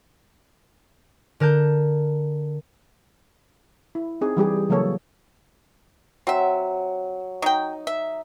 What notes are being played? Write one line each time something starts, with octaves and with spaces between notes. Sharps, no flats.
D3 A#4 A5 G6
E4
C4 D#4 G#4
E3 G3 G4 G#4
C#3 E3 F#3 A#3 A4 C#5
F#3 C4 E5
F#3 D#4 G5
E5